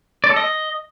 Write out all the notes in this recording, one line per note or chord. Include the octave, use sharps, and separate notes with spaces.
D5
A4
D#5